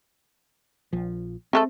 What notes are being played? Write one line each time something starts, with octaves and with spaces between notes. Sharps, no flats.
A#1 F3
G#3 A3 C4 A4